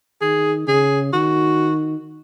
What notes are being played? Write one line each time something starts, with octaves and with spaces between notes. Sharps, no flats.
D#3 G#4
C#3 G#4
D#3 F#4